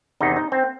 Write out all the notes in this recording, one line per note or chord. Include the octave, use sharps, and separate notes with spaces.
E2 C3 D#3 D#4
D#4
C4